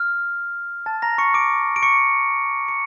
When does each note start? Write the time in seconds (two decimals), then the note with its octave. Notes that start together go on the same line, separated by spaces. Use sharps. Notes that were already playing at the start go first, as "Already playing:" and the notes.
Already playing: F6
0.86 A5 A6
1.02 A#5 A#6
1.18 C#6 C#7
1.34 D6 D7
1.76 D7
1.83 C#6 C#7
2.68 C#7